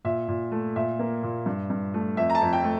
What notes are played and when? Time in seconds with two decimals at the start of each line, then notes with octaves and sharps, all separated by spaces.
0.05 A#2 E5
0.28 A#2
0.52 A3
0.76 A#2 E5
0.99 A#3
1.23 A#2
1.46 G2
1.70 G2
1.94 A3
2.17 F2 E5
2.30 A#5
2.35 A5
2.41 F2
2.53 G5
2.64 A3